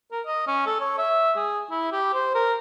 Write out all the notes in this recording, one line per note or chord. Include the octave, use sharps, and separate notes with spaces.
A#4
D#5
C#4
A4
C#5
E5
G#4
E4
G4
C5
A#4